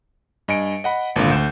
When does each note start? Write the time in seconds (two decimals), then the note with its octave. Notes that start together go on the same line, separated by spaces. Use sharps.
0.48 G2 D#5 G#5 C#7 D7
0.84 D#5 F#5 B5
1.16 G#1 A#2 D3 F5
1.30 D2 G6 E7